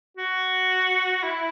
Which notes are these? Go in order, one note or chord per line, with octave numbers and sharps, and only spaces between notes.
F#4
E4